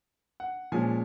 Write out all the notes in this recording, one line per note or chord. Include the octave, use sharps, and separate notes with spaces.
F#5
A#2 F3 G#3 C#4 G#5